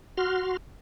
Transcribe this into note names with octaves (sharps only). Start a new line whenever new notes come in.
F#4 C6 F6